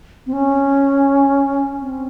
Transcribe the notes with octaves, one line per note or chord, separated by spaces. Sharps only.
C4
C#4
C4